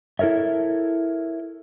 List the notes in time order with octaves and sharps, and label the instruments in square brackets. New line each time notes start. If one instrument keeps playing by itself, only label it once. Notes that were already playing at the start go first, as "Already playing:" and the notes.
[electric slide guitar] E4 A4 A#4 C#5 E5